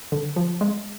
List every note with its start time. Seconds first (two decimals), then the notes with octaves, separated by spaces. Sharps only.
0.12 D3
0.36 F3
0.61 G#3